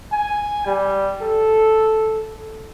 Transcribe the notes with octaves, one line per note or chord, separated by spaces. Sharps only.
G#5
G3
A4